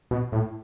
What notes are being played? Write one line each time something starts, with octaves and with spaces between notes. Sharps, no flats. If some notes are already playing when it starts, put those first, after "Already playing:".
B2
A2